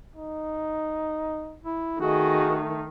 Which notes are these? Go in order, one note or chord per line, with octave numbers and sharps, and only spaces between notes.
D#4
E4
D#3 A3 F#4 G#4 D#5